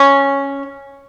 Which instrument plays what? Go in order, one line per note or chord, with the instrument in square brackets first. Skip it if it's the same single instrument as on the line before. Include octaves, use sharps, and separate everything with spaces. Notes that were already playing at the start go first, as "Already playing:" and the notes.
Already playing: [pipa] C#4